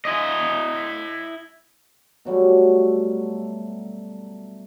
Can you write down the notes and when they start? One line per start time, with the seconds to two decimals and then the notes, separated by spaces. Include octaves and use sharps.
0.05 E4 D#5
2.25 B2 F#3 G3 A3